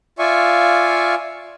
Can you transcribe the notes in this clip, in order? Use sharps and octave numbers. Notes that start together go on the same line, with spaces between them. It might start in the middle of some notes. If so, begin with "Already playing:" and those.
F4 D5 E5 F5 G#5 C#6